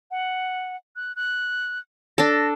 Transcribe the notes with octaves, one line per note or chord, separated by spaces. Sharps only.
F#5
F#6
F#6
D4 A4 A#6